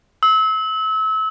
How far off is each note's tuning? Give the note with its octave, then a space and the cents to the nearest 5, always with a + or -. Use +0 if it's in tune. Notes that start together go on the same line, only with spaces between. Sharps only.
E6 -30